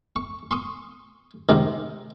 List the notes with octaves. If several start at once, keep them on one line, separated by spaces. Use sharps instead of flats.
C#6
C6 C#6 D#6
G#2 C3 D#3